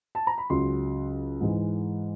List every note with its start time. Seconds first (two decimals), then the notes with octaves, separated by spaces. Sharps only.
0.15 A5
0.27 A#5
0.38 B5
0.50 C#2 C#3 F#3 C6
1.41 G#2 E3 G#3